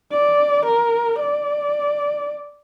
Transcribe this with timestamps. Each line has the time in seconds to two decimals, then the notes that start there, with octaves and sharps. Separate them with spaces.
0.12 D5
0.66 A#4
1.20 D5